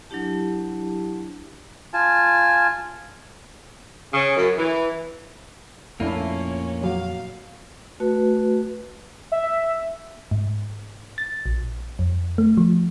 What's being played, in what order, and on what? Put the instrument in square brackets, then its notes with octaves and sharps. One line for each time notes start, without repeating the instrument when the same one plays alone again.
[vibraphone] F#3 D4 E4 G4 A5
[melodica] F4 G#5 A5
[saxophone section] C#3
F#2
E3
[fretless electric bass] F2 A#2 [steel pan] A3 D4 E4 [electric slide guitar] A#3 F4 [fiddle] C#4
[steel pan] F#3 [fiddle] F5
[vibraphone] A3 F#4 B4
[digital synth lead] E5
[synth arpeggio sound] G#2
A6
A#1
F2
A3
F3